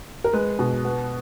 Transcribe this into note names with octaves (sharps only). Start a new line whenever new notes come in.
A#4
G#3 B4
B2
B3